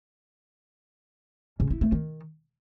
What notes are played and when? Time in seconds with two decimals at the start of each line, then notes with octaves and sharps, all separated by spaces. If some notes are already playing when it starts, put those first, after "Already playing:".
1.60 C#3
1.71 E4
1.81 A3
1.92 D#3